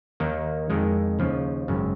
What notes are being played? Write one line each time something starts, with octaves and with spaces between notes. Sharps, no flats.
D#2 D#3 A#3
F2 D#3 G#3
D#2 C#3 F3
G#1 F#2 C#3